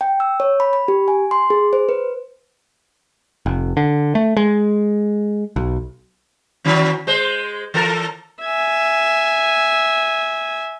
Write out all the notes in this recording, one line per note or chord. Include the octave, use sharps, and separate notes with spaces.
G5
E6
C#5
B5
B5
G4
G#5
C6
G#4
C5
B4
F1
D3
A3
G#3
B1
D#3 F#3 C#4
G#3 C5
E3 A4 A#4
E5 G#5